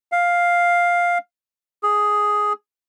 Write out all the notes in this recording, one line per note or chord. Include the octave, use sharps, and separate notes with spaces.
F5
G#4